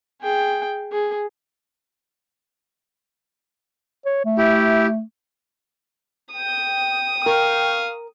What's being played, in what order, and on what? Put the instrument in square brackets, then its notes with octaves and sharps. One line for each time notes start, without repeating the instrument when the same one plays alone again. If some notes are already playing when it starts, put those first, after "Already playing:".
[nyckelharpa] G#4 G5
G#4
[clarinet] C#5
A3
[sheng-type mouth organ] E4 G4
[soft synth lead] G5 [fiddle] D#6
[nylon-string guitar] A#4 [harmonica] F5 C#6